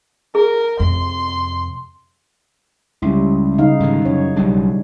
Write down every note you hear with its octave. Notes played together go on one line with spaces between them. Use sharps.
G#4 A#4
F2 C3 C6
C#2 G3 C#4 E4
C#3 D#4 F5
G#2 D3 D#3
F#2 C#5
B1 F#3 G3 D4